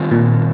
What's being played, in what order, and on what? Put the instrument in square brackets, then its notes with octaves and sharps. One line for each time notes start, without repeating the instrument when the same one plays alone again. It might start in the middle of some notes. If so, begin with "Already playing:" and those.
Already playing: [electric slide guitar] D#3 G3 C4 F4
[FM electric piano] A#2